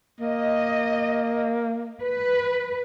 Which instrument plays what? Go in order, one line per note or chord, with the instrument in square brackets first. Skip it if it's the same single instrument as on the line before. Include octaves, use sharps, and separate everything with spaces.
[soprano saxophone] A#3 [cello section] D#5
[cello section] B4